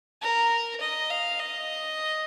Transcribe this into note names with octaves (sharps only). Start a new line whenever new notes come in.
A#4
D#5
F5
D#5